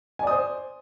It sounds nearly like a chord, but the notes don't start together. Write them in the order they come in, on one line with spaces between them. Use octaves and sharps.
G#5 D5 D#6 C5